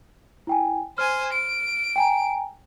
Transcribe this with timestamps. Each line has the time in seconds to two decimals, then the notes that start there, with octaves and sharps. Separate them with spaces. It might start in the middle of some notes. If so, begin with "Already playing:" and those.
0.47 E4 G5 G#5
0.98 C5 G#5 F6
1.33 D7
1.96 G5 G#5 A#5